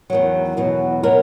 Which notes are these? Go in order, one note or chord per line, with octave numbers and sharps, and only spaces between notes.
E2 D#3 F#3
E2 B2 F#3
B2 F#3 A#4